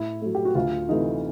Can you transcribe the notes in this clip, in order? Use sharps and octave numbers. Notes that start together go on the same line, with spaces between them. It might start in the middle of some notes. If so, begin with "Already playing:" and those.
Already playing: A2 E4
F#3 A3
G4
F#4
D2 F4
C3 E3 A3 D#4